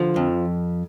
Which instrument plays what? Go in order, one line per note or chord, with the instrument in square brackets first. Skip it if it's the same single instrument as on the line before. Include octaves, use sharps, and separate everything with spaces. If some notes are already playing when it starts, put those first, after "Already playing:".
Already playing: [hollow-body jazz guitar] D3 F3
F2